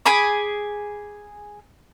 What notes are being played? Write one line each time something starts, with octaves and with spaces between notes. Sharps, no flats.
G#4 G#5 B5 D6